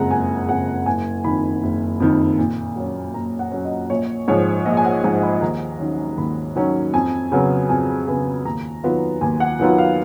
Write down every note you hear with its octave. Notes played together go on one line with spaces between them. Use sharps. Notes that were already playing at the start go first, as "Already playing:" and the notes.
Already playing: F#1 F2 C#3 G#3 F#5 A#5
F#1 G#5
F2 C#3 G#3 F#5
F#1 G#5
F2 D#3 B5
F#1
F2 D#3
A#2
F#3 C#4
A#2 A#5
F#5
F#3 C#4
D#5
A#1 C#5
G#2 F3 C#5
A#1 D#5
G#5
F#5
G#2 F3 G#5
B5
D#2 A#5
D#3 F#3 C#4
D#2 B5
D#3 F#3 C#4
F2 G#5
C#3 F#3 B3
F2 G#5
C#3 F#3 B3
D#2 A#5
D#3 F#3 B3 F4
D#2 G#5
F#5
D#3 F#3 B3 F4
F5